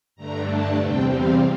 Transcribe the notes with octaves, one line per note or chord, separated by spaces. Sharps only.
G2 D3 A3 D4 A#5
A5
E2 C3 G3 C4 G5
F5